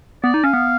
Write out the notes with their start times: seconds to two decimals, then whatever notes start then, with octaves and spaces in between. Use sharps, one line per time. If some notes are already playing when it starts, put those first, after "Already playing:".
0.23 B3 D5
0.34 D#4
0.44 C#4 F5
0.53 B3